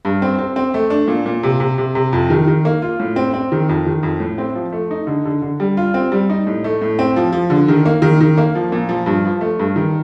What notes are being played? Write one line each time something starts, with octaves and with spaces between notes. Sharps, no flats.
G2
C4
C4
C4
A3
D4
A#2
A#2
C3
C3
C3
C3
F2
D#3
D#3
A#3
F4
A2
C4
C4
D#3
F2
D#3
F2
A2
C4
F3
A3
D#4
D3
D3
D3
G3
F4
C4
G3
D#4
A2
A3
A2
C4
F3
F3
D3
D#3
A#3
D#3
D#3
A#3
F3
A#2
F3
G2
F3
A3
G2
D#3